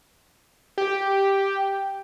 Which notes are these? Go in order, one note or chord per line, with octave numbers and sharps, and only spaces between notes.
G4